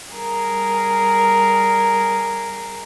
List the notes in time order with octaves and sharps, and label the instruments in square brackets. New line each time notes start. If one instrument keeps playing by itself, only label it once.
[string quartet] G3 G#4 A#4